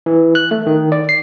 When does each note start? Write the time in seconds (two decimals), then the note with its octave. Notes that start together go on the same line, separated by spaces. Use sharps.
0.06 E3
0.35 F#6
0.51 A3
0.67 D#3
0.92 D5
1.09 C7